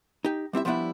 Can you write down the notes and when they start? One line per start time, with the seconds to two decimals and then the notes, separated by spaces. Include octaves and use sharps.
0.25 D#4 G4
0.53 G3 C4 E4 E5
0.65 F3 G3 B3 D4 E4